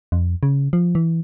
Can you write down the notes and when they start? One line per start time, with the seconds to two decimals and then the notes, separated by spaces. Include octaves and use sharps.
0.12 F2
0.43 C#3
0.73 F3
0.95 E3